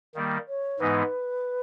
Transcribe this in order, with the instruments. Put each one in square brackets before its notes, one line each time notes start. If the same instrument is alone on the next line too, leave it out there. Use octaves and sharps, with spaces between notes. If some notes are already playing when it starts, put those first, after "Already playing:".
[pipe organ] D#3 G3 A#3
[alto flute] C#5
[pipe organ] G#2 E3 G#3 B3 D#4 [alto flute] B4